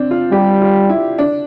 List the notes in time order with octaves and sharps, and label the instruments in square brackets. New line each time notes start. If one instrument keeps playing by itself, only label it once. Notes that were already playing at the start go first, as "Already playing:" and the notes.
Already playing: [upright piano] C4 D4
F4
[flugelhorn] G3 [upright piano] G4
[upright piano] F4
E4
D4